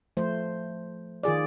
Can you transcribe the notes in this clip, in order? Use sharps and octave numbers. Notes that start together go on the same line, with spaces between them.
F3 A3 C5
D#3 F4 G#4 D5